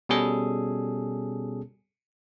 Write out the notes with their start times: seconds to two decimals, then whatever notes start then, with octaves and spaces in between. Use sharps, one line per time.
0.09 B2 G3 C#4 G#4 A4